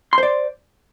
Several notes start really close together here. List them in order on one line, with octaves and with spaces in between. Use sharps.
C6 C5 D5